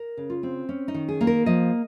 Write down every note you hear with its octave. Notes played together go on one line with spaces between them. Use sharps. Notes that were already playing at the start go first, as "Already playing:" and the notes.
Already playing: A#4
C#3
F4
C4
C#4
D#4
D#3
G#4
A#3
A#4
F3 D#5